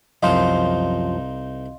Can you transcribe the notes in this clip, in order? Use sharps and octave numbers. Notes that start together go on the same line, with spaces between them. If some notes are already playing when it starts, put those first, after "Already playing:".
C2 F#2 F3 D#4 C5 D#5 F5 C6